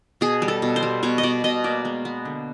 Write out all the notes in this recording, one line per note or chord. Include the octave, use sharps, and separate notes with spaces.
B2 G#4
G3
A4
B2
C5
G3
B2 C#5
D#5
B2 D5
B2 D#5
A#3 D5
G#3
B3
D3